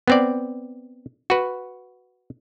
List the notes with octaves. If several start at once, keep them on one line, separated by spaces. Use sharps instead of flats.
B3 C4 D5
F#4 B4